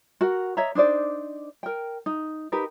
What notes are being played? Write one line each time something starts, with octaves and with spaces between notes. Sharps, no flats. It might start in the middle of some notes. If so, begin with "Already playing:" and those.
F#4 A#4 F#5
C#5 D#5 E5 A#5
D4 D#4 C5 D5
A#4 G5
D#4
D#4 G4 A#4 B4